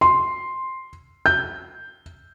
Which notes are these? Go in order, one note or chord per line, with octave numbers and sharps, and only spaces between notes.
C6
G6